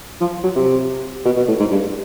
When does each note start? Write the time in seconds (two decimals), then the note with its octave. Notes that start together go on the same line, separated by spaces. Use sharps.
0.21 F3
0.43 F#3
0.56 C3
1.25 B2
1.37 B2
1.48 A2
1.60 G#2
1.71 G2